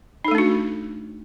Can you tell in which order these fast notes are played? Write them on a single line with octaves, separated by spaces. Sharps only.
D#4 A4 A3 D4 F#4